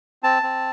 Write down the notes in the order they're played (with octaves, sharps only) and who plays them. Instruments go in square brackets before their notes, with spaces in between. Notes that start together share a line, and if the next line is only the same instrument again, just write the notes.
[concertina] C4 A5
C4